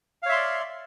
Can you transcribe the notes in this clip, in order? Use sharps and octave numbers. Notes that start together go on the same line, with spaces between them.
C#5 D5 E5 F5 C6